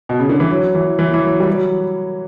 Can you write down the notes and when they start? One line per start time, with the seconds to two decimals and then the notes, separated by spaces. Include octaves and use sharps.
0.09 B2
0.19 C#3
0.29 D3
0.40 E3
0.50 F#3
0.75 E3
0.99 E3
1.14 E3
1.23 F#3
1.40 G3
1.47 F#3